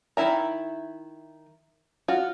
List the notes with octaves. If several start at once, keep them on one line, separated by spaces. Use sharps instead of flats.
D#3 E3 E4 E5 A#5
F4 F#4